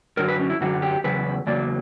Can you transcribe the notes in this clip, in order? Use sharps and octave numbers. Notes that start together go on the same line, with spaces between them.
F#2 D3 F#3 A#4
B4
C#4
E4
F#2 D3 F#3 F#4
G4
E2 C#3 F#3 B4
E2 C#3 F#3 A#3 D5